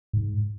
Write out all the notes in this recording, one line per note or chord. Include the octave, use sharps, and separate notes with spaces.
G#2